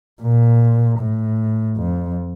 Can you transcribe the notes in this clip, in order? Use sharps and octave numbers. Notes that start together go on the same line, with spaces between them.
A#2
A2
F2